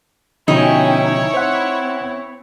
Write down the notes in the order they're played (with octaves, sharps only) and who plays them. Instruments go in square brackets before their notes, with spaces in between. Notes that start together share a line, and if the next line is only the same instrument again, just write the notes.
[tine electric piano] B2 D3 F3 [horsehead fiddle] C#4 G5 [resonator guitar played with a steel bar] D#4 [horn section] E4 C#5
[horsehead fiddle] C4 [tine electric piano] C5 F#5